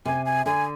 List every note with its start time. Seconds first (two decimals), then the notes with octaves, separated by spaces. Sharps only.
0.05 C3 G#5
0.26 G#5
0.46 D3 G#5